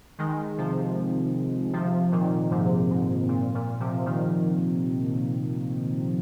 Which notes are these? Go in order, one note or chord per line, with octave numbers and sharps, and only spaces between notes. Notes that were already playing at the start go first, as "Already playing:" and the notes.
D#3 G#3
C3 F3
C3 F3
A#2 D#3
G#2 C3
G#2
A#2
A#2
C3 F3
A#2 D#3